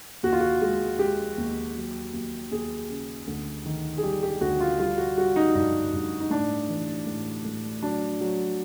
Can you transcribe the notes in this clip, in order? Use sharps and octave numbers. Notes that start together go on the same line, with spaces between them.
D#2 F#4
F4
F#4
G#3
G#3 G4
D#2
F#3
D#2
D#2 G#4
C#3
D2
D#3
G#4
G3 G4
G4
D2 F#4
F4
G3 F4
F#4
G3 F#4
D#4
G2 D#4
G2
D#4
A2 D4
E3
A2
A2
F#3 D4
F#3